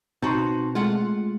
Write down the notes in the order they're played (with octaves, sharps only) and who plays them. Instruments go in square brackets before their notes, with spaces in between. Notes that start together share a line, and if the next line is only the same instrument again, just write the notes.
[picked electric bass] B2 C4 [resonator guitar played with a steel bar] D#4 F#4 [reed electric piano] A5 C6
[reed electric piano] G#3 A3 [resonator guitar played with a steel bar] F4 F#5